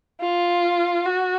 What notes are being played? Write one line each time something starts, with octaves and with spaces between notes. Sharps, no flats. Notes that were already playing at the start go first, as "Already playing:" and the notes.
F4
F#4